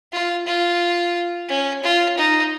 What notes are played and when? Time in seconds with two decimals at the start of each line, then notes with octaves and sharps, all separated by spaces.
0.12 F4
0.46 F4
1.49 C#4
1.83 F4
2.17 D#4